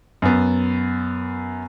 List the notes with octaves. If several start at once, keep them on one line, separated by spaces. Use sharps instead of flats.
F#2 B3